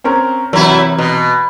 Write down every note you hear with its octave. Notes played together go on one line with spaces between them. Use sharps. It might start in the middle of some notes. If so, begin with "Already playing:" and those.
C4 C#4 A#4
C3 E3 F#3 E4 A#4
B2